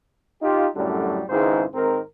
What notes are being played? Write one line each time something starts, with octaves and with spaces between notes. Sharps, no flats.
D#4 F4 G4
F#2 A2 D3 F#3 G3
G#1 C#2 G#2 D#3 E4 C5
G#1 D#3 C4 A#4